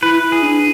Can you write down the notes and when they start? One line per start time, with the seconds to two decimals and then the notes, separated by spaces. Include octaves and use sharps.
0.02 E4 B4
0.23 E4
0.32 G#4
0.42 D4